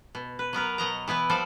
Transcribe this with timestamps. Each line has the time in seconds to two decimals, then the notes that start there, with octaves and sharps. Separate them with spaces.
0.15 B2
0.39 B4
0.53 F#3 B3 A#4 B4
0.78 B2 F#3 D#5 A#5
1.08 E3 B3 E4 B4
1.30 F3 G3 A4 C5 D5